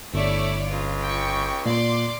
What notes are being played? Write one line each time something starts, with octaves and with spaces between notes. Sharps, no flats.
G1 A3 E4 C#5 D5
C#2 F4
G5 C#6
A#2 D5 C6 D6